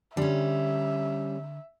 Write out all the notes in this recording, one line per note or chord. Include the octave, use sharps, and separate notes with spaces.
D3 G3 C#4 E5